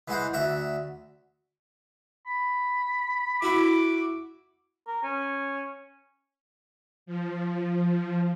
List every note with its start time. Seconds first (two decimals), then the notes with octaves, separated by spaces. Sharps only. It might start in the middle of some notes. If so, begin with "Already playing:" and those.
0.08 E3 G#3 F#4 C5
0.33 D2 F#4 E5
2.26 B5
3.42 E4 F#4 D6
4.87 A#4
5.03 C#4
7.06 F3